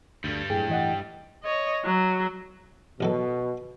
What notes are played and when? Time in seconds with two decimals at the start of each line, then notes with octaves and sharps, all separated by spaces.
0.24 D2 G2 D3 G3
0.50 F#2 A2 G#4 G5
0.69 E3 D#5 F#5
1.43 C#5 D#5
1.84 F#3
3.01 A1 B2 F#3 A4